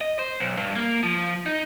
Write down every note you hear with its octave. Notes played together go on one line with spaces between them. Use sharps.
D#5
C5
B1
G2
A#3
F3
D#4